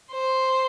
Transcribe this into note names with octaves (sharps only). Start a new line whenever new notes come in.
C5